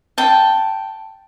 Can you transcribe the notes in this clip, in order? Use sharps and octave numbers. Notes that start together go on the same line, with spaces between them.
G5 A5